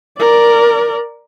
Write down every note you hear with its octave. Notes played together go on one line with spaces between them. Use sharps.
A#4 D5